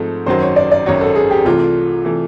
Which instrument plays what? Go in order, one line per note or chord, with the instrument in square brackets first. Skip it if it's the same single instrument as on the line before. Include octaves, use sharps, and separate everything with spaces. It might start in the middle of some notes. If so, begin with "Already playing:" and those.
Already playing: [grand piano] G#2 F3 A3 C4
[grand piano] G#1 F#2 D#3 F#3 [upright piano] C5
[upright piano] C#5
D5
D5
[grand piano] G#1 F#2 D#3 F#3 [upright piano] C#5
[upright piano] A4
G#4
G4
[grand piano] C2 C3 E3 A3 [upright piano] F4
[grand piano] C3 E3 A3